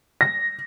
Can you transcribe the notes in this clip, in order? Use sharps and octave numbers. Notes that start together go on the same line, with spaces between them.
A#6